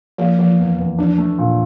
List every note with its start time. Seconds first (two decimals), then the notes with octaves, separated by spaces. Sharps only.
0.18 F3 A#3
0.38 E3 F3
0.59 E2
0.79 E2
0.98 F3 D4
1.18 A3
1.38 A#2